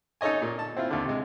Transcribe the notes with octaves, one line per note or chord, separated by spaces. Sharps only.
D#4 A4 C#5 D#5 G#5
A#2
A5
C4 E4 F4
D#2 D3
C3 G#3